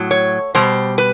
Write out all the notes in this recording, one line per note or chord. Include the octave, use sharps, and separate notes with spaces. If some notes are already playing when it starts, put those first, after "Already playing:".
Already playing: A2 F#3
C#5
B2 G3 C5
B4